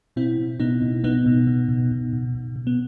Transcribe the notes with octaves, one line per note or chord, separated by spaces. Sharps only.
B2 C4 E4
B2
B2 B3 D#4
B2
B2 B3 D#4
B2
B2
B2
B2
B2
B2
B2
B3